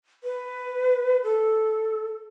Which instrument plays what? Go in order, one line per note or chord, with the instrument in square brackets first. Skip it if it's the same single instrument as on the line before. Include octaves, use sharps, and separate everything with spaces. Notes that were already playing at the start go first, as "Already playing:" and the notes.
[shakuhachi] B4
A4